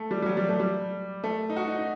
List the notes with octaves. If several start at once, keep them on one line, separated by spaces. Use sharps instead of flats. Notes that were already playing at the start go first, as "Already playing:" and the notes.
Already playing: A3
G3
G3
F#3
G3
A3
G3
A3
D#4
F#4
D#4
D#4